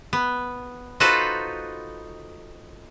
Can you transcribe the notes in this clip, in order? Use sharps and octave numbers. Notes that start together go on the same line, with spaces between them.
B3
D#4 F4 F#4 A4 B4 C5